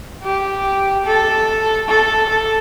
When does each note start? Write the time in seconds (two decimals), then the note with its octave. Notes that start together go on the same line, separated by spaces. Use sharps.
0.23 G4
1.06 A4
1.88 A4
2.29 A4